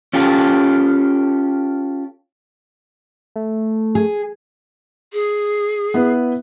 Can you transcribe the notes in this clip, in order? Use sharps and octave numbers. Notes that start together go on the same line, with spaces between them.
C#4 F4 G4 A4
A3
G#4
G#4
B3 E4 B4